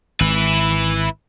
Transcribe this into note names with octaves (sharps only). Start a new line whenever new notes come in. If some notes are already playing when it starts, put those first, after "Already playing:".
G#1 E4 B4